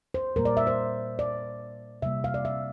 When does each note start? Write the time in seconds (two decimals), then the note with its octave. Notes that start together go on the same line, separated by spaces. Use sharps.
0.14 C5
0.36 A#2 G3 A#3 A#4
0.45 D5
0.57 E5
0.67 C5
1.19 D5
2.02 C3 G3 A#3 E5
2.24 F5
2.34 D5
2.45 E5